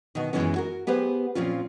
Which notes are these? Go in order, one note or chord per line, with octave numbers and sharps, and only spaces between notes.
B2 D#3
F#2 C3 E3 G#3 B3 C#4
F#4 A#4
B3 G4 G#4 B4 C5
A#2 F3 C4 C#4 F4